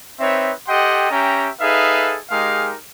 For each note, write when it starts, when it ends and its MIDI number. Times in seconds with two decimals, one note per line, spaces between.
0.20 0.52 60
0.20 0.52 63
0.20 0.52 71
0.20 0.52 73
0.20 0.52 76
0.68 1.09 67
0.68 1.09 69
0.68 1.09 75
0.68 1.09 78
0.68 1.09 79
0.68 1.09 84
1.11 1.50 61
1.11 1.50 67
1.11 1.50 76
1.11 1.50 79
1.11 1.50 82
1.61 2.18 63
1.61 2.18 68
1.61 2.18 69
1.61 2.18 71
1.61 2.18 76
1.61 2.18 77
2.30 2.74 56
2.30 2.74 63
2.30 2.74 67
2.30 2.74 68
2.30 2.74 70
2.30 2.74 77